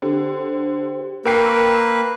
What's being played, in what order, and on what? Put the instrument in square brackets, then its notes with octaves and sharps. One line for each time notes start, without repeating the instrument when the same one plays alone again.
[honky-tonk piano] D3 [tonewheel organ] G4 C5
[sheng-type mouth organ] A#3 B4 [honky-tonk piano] A#4 G5 C7 [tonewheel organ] C#6 D6 E6